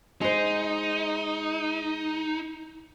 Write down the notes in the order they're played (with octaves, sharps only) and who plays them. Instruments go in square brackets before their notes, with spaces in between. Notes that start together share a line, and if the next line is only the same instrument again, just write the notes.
[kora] G#3 C5 [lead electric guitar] D#4